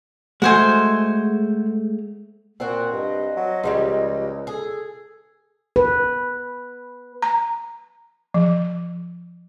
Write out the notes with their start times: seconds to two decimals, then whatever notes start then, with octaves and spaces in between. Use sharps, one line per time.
0.42 G#3 A3 F#4 C5 G#5
2.60 A#2 C4 F#4
2.92 G2 D#5
3.36 F#3
3.63 C#2 F3 G3 G#3
4.47 G#4 A4
5.76 B4
7.22 A#5
8.34 F3